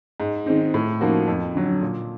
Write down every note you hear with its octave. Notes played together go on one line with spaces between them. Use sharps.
G#2
D#3 G#3 C4 D#4
A2
F3 A#3 D#4 F#4
F2
D3 F#3
A#2